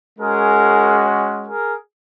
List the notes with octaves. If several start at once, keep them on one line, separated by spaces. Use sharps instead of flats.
G#3 C#4 F#4 G#4 A#4
G#4 A#4